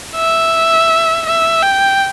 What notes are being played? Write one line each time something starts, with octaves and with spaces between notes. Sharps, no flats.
E5
E5
G5